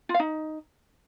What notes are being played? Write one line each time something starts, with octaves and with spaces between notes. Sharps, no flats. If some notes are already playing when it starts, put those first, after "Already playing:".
F4
F5
D#4